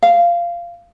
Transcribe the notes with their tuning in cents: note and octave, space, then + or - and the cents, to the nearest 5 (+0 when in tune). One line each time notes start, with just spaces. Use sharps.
F5 -15